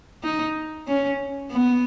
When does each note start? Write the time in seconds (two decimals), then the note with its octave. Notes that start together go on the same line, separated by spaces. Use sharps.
0.23 D#4
0.88 C#4
1.51 B3